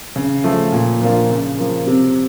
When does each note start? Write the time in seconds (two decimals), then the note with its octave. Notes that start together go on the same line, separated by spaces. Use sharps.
0.16 C#3
0.44 F3 A3
0.72 A#2
1.01 F3 A#3 D4 F4
1.30 C#3
1.58 F3 A#3
1.87 C3